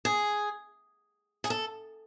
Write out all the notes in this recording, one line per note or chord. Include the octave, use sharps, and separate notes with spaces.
G#4
G#4
A4